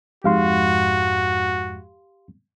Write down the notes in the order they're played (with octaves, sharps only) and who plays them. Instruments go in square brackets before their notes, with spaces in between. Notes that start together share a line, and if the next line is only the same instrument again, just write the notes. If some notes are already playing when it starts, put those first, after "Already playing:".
[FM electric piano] F2 G#2 [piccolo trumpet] F#4 [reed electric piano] G4 F5 C6